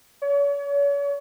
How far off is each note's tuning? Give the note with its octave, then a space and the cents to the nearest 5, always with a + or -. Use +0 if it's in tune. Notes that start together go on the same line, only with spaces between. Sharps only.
C#5 +40